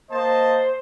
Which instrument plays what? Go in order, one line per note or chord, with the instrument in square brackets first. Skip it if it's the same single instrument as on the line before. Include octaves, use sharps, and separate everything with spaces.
[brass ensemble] A#3 D#5 A5 [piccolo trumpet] C5